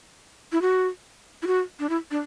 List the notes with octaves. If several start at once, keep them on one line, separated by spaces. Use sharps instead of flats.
E4
F#4
E4
F#4
D4
E4
D4